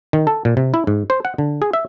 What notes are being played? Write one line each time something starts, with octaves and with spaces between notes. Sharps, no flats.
D#3
A4
A#2
C3
E4
G#2
C5
F#5
D3
G#4
E5